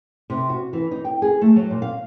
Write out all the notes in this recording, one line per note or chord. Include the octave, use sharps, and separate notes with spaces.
C3
F#4
E3
D#4
G5
G#4
A3
F#3
A#2
F5